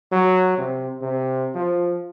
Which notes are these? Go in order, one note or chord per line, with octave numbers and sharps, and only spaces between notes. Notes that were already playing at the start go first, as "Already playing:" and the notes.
F#3
C3
C3
F3